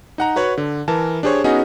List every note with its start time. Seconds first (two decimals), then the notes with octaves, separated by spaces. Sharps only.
0.18 D#4 F#5 A#5
0.36 F#4 B4 C#5 F#5
0.58 D3
0.88 E3 A#4 A5
1.23 D4 G4 G#4 C5 C#5
1.44 B3 C#4 D#4 F#4 G#4 D#5